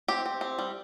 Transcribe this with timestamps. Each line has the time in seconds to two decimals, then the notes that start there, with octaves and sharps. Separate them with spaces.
0.08 C4 G4
0.26 C4
0.41 C4
0.59 G3